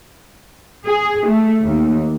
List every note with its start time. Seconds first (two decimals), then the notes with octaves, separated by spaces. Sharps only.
0.85 G#4
1.26 A3
1.64 D#2